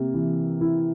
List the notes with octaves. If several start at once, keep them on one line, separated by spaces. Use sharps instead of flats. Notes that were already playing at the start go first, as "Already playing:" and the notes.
Already playing: C3 A#3
E3
E4